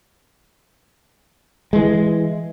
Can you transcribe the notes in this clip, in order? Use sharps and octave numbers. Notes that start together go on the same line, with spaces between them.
E3 G#3